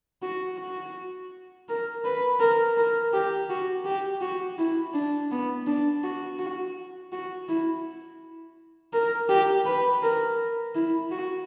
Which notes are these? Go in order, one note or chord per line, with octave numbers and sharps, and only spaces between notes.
F#4
F#4
A#4
B4
A#4
A#4
G4
F#4
G4
F#4
E4
D4
B3
D4
F#4
F#4
F#4
E4
A#4
G4
B4
A#4
E4
F#4